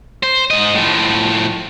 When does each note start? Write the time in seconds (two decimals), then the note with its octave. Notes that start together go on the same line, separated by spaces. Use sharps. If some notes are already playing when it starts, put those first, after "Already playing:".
0.23 C5
0.50 G#2 D#5
0.75 A2 F3